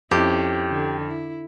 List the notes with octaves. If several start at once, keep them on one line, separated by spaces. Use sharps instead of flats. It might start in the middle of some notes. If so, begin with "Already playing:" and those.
F2 C#4 E4 G4
D3
E4